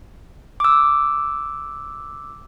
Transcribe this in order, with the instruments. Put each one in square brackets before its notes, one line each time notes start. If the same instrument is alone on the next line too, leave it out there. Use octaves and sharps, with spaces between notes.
[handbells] D6 E6